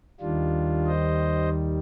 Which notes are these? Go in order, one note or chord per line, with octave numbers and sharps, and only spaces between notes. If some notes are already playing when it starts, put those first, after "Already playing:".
D#2 D#3 G3 D4 F4
C5 D#5